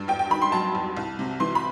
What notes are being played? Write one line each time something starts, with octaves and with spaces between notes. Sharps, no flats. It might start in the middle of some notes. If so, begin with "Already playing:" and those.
Already playing: G2 G3
E2 G5
G5
D#3 B5
C6
F#3 A5
E2
C2
C3
E3 C6
B5